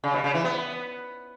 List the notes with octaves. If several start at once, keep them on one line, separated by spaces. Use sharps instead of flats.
C#3
B2
C#3
E3
B3